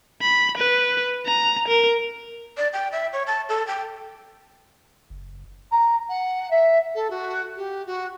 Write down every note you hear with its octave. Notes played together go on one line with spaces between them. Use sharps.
B5
B4
A#5
A#4
D5
G5
E5
C#5
A5
A4
G5
F#1
A#5
F#5
E5
A4
F#4
G4
F#4